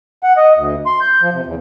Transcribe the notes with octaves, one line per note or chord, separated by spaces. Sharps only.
F#5
D#5
D2
C6
G6
F3
C3
E2